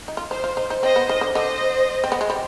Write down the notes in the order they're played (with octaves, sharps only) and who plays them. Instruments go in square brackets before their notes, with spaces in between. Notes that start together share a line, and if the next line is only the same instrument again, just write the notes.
[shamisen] D#4
F4
[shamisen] D#4 [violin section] C5
[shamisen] F4
D#4
D#4
[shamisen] C4 [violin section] C5 D#5
[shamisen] B3
D#3
D3
[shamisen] D3 [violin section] C5 D#5
[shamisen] C4
B3
G#3
G3